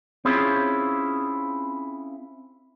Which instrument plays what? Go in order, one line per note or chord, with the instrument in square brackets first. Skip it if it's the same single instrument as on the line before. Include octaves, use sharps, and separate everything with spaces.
[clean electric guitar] C4 C#4 E4 F4 G#4 C#5